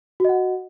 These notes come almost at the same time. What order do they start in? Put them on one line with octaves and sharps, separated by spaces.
F#4 D#5 F#5